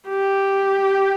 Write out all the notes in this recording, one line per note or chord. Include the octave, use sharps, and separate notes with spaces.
G4